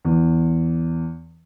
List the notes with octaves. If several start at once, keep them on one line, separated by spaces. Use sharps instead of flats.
E2